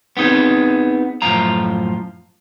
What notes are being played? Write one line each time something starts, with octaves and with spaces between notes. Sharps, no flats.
B3 C4 D#4 G#4
F#2 A2 F3 F4 A#5